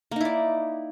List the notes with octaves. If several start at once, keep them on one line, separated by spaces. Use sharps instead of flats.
A#3 D#4 E4 D5